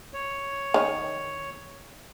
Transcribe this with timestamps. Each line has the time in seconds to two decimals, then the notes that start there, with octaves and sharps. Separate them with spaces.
0.14 C#5
0.74 D#3 C#4